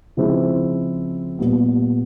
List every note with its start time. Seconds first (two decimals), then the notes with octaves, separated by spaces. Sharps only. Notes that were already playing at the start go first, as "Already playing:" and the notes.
0.17 C#3 F3 G#3 C4 E4
1.39 A#2 G3 B3